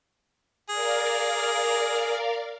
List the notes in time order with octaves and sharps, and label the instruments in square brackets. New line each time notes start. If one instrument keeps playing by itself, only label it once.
[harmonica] G#4 [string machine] A#4 D5 F5